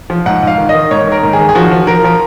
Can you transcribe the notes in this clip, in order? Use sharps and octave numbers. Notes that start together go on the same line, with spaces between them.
F3
G#2 F#5
G#2 F5
D#3
D#5
D#3
G#2 C#5
D#3 A#4
G#2
G#4
D#3
G#4
F3 F#4
F3
F3 A#4
F3